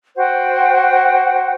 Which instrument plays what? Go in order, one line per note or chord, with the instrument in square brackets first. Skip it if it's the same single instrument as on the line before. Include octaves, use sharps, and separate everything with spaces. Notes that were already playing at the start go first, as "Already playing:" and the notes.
[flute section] F#4 C5 F#5 G5